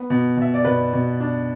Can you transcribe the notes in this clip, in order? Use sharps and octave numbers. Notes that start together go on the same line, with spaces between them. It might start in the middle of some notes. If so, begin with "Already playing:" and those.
Already playing: B3
B2
B2 E5
D5
B2 B4
B2
D4